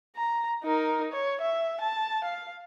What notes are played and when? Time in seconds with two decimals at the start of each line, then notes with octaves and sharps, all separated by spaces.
0.16 A#5
0.64 D#4 A#4
1.12 C#5
1.41 E5
1.81 A5
2.25 F5